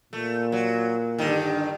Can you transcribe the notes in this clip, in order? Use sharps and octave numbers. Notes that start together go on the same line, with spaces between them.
A#2 A3
F#3
G2 D3 D#3